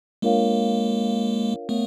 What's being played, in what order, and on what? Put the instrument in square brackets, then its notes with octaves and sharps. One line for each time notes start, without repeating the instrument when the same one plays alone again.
[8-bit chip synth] G#3 A#3 [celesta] D4 F4 A#4 C#5 F5
[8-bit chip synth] A3 B3 [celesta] A#4 C#5 F5